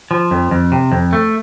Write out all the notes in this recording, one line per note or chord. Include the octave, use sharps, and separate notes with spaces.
F3
F2
F2
C3
F2
A3